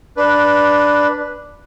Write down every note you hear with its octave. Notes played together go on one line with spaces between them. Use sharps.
D4 B4